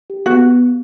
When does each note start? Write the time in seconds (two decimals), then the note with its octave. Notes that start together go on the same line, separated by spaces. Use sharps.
0.10 G4
0.26 B3 F#4